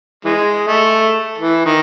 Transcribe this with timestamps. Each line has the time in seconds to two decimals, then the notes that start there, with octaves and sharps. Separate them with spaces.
0.25 E3 G#3
0.67 A3
1.38 E3
1.66 D#3